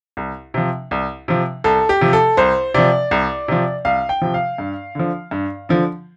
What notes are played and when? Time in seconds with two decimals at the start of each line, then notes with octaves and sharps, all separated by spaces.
0.17 C2
0.54 C3 F3
0.91 C2
1.28 C3 F3
1.64 C2 A4
1.89 G4
2.01 C3 F3
2.13 A4
2.37 C2 C5
2.74 C3 F3 D5
3.11 C2
3.48 C3 F3
3.85 C2 F5
4.09 G5
4.22 C3 F3
4.34 F5
4.58 G2
4.95 D3 F3
5.31 G2
5.69 D3 F3